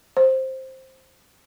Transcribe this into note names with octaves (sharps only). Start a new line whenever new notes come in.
C5